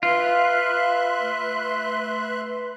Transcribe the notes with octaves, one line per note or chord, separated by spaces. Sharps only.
F4 B4 E5 F5 C6 F#6
A3